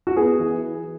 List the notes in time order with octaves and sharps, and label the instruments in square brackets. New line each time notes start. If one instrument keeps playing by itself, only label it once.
[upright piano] F#4
B3 G#4
E3